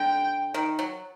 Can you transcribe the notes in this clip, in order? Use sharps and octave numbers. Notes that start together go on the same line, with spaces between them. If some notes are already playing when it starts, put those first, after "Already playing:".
Already playing: D3 G5
D#3
F#3